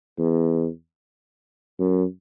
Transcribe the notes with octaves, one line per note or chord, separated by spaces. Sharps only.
E2
F#2